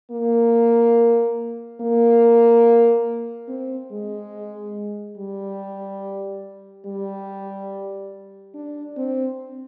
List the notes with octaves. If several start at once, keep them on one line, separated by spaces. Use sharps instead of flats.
A#3
A#3
C4
G#3
G3
G3
D4
C4